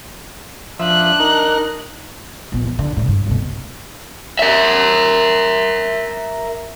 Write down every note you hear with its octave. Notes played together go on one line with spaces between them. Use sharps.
F3 D4 E5 F#6
D#4 A#4
A#1 B3
E3
D3
C2 A2
G2
F1 B2
A#4 E5